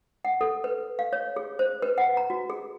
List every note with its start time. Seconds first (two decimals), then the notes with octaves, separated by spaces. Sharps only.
0.25 F#5
0.41 A4
0.64 B4
0.99 F5
1.13 C#5
1.36 G#4
1.59 C5
1.82 B4
1.98 F#5
2.17 A#5
2.30 F#4
2.50 G#4